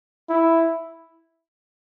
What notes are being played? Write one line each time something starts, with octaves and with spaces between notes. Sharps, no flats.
E4